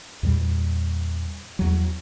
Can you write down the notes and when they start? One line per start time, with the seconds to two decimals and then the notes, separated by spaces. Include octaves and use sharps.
0.23 E2 A#2 G3
1.59 E2 F#3